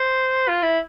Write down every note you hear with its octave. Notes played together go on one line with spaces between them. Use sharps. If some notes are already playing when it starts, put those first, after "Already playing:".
Already playing: C5
F4
E4